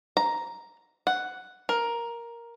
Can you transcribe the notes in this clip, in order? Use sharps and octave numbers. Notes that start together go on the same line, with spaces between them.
A#5
F#5
A#4